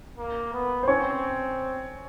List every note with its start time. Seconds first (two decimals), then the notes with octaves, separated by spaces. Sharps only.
0.18 A#3
0.53 B3
0.83 C5
0.87 C4 C#4 C#5